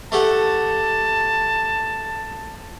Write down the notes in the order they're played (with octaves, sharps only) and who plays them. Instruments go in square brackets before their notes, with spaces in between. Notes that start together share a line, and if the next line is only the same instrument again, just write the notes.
[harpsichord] A3 G4 F#5 [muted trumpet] A5